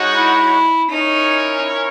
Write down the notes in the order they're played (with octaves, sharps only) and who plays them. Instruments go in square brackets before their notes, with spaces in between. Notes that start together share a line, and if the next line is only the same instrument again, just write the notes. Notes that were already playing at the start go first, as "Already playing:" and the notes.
Already playing: [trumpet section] G#3 D#4 F#4 C#5 F#5
[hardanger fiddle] E4
[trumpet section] C#4 E4 A#4 C#5 [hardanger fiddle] D#4